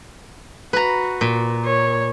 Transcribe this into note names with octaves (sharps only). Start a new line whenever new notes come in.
F#4 B4 A#5
A#2
C#5